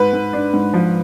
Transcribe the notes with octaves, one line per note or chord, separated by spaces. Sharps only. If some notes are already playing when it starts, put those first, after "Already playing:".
Already playing: G#2 B4
G#2
D4
G#2
F3